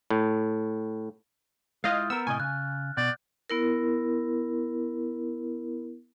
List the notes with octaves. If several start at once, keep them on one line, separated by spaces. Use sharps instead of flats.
A2
G#3 E4 F4 D#5 F5 F6 G6 A6
B3 A#4 E6
A2 C3 D#5 G#5
C#3 F#6
B2 D5 G6
B3 E4 A#4